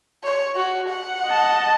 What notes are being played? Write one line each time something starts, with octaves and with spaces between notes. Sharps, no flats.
C#5
F#4
F#5
D#5 A5